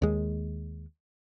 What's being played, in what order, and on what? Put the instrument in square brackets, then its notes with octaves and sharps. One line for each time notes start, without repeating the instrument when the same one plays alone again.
[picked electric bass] D#2 G#3